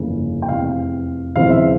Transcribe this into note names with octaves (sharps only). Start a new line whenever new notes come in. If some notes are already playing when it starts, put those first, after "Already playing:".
Already playing: G1 F2 C#3 E3 A#3
G5
F1 E2 C3 F5
E1 E2 C#3 F3 C4 F5
E5